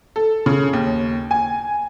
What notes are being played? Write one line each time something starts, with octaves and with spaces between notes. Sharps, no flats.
A4
C#3
D#2
G#5